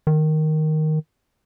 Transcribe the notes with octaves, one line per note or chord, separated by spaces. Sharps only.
D#3